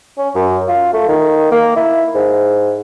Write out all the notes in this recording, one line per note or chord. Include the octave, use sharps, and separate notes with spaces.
C#4
F#2
F4
A3
D#3
A#3
E4
G#2